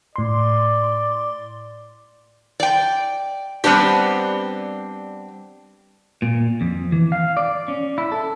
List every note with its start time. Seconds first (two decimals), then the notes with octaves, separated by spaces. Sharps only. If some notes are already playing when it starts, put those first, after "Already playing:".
0.16 A2 D5 C6
2.60 D5 G5
3.64 G3 B3 C4 D4 G4
6.22 A#2
6.61 F2
6.92 E3
7.12 F5
7.37 D5
7.68 C#4
7.98 E4
8.12 A4